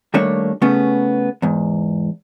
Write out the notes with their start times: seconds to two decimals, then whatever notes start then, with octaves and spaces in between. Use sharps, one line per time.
0.14 D#3 G3 A3 A#3 D4 C#5
0.62 C#3 A3 B3 C#4
1.42 E2 G#2